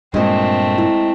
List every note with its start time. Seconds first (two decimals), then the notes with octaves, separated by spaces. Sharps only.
0.14 G2 A#2 G#3 A3 C4 D#5
0.78 E4